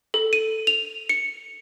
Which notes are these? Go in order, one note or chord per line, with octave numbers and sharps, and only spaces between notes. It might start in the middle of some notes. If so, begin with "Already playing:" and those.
A4
D#7
F7
C#7